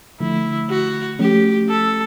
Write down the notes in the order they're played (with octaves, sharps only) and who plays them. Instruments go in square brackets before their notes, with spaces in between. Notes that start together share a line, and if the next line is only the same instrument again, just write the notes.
[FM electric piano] D3 F3 A3 [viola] E4
[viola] F#4
[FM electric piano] F3 A3 C#4 [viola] G4
[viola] A4